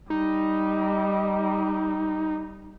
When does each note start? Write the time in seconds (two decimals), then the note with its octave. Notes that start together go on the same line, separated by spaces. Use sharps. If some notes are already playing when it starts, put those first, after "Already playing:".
0.10 G3 D#4